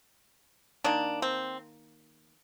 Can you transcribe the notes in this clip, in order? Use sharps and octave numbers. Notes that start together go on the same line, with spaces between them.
D#3 A#3 D4
C4